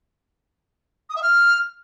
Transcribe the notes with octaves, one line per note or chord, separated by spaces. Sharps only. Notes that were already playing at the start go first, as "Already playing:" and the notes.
D#6
E5
F6